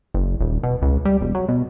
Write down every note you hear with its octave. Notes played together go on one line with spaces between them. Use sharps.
F#1
D#1
B2
C#2
G3
E1
F#3
B2